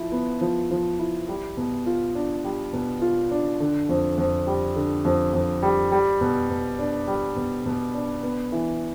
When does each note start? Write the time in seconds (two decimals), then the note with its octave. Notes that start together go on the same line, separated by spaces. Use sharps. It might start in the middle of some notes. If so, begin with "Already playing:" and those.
Already playing: F3 E4
0.12 B3
0.41 F3
0.71 F3
0.99 E4
1.28 G3
1.57 B2
1.86 F4
2.15 D4
2.44 G3
2.73 B2
3.02 F4
3.31 D4
3.60 D3
3.89 F2
4.18 F2
4.47 G3
4.76 D3
5.05 F2
5.33 F2
5.62 G3
5.92 G3
6.21 B2
6.50 B2
6.79 D4
7.07 G3
7.36 B2
7.66 B2
7.94 D4
8.23 B3
8.52 E3